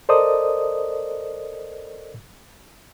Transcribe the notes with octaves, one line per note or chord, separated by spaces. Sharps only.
A4 A#4 C5 D5 D#5 D#6